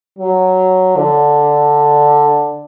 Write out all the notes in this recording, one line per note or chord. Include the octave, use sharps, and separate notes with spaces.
F#3
D3